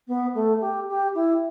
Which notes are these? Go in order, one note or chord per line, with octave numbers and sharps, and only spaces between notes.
B3
A3
G4
G4
E4